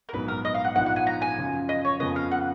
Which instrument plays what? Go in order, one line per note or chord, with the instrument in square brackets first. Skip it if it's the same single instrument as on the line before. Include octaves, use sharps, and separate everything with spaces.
[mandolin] A#4
[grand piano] A#1 G#2 F#3 B3 [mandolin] B4
[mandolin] A#4
D#5
F5
F#5
[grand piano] A#1 G#2 F3 B3 D#4 [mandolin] F#5
[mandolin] F#5
G#5
A#5
G#5
[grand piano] F#2 C#3 F3
[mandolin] D#5
C#5
[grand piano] F2 C#3 F3 B3 [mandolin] D#5
[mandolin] F5
F#5